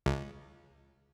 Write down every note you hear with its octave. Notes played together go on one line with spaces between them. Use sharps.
C#2